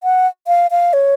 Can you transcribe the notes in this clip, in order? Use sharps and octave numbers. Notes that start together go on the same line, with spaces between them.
F#5
F5
F5
C#5